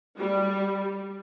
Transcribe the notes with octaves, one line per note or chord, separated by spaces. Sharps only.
G3